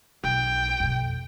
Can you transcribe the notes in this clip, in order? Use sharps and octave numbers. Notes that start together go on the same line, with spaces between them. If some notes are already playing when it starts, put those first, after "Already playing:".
B1 G5
F2 B2